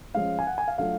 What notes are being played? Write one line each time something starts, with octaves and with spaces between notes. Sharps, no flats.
F3 G#3 C#4 F5
G#5
F#5
G#5
F5
F#3 A3 D4 F4 F5